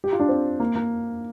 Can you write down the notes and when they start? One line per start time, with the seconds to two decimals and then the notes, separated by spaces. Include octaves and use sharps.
0.04 G4
0.13 F4
0.20 D4
0.29 C4
0.60 A#3
0.76 A#3